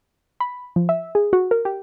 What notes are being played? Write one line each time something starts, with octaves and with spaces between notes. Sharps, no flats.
B5
F3
E5
G#4
F#4
A#4
G4